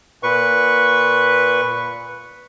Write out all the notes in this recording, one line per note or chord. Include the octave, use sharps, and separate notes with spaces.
A#2 B4 C#6